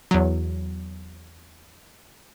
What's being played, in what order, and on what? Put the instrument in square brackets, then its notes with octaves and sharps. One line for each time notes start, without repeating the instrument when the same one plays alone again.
[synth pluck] E2 F#3